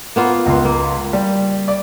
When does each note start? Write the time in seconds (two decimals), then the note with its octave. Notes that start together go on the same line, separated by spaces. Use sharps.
0.16 A#3 B3 F4
0.46 C#2 C6
0.65 A#3
1.13 G3
1.68 D5